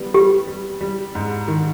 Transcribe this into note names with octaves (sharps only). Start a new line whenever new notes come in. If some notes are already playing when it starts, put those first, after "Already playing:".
Already playing: G3 B3
G3 G4
G3
G3
G#2
D#3